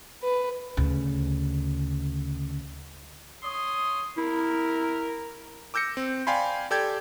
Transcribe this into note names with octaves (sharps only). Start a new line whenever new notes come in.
B4
D2 C#3
C#5 C6 D#6
E4 A#4
D6 E6 G6 A#6 C#7
C4
D5 F5 G5 G#5 B5 C6
G4 A4 D5 G5 G6 G#6